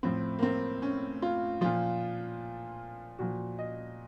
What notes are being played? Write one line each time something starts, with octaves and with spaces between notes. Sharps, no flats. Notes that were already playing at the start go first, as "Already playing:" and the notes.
A2 F3 C4
A#3
C4
C#4
F4
A#2 F3 F4
A#2 F3 F#4
D#5